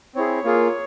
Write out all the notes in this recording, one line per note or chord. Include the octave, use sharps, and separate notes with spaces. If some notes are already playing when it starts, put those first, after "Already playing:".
C4 E4 G#4 C#5
A#3 F4 G#4